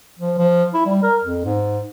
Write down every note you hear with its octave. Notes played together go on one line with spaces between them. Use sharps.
F3
F3
E4
G3
A#4
F2
G#2